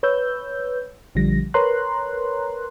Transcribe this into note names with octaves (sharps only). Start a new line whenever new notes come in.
B4 C#5 E6 G6
A#1 D3 F3 G3 A#6
A#4 B4 C#5 A#5 C6 F#6